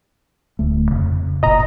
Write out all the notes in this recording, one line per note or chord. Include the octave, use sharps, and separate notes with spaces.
D1 D2 A3
F2 C#3
F#1 A#2 D#5 A#5